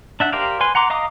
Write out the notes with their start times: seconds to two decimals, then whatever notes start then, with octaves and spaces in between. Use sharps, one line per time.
0.20 D4 E5 F#5
0.32 G4 A#4 C5 D5 F5
0.61 B4 G#5 C6
0.75 F#5 A#5 C6 D6
0.90 D#5 F5 A#5 D6 D#6